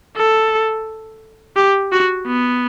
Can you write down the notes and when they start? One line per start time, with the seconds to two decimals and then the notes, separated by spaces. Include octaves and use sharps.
0.17 A4
1.56 G4
1.92 F#4
2.27 B3